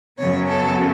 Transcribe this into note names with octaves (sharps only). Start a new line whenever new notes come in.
F#2 C#3 F#3 B3 C#5
A4